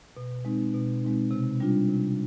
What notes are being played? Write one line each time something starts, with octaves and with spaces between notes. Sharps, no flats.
B2
G#3 C4 D#4
B2
G#3 C4 D#4
C3
G3 D4 F4
C3